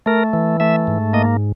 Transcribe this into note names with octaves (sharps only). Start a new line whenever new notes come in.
A3 A#4
E3
A3 E5
G#2
A#3 D#5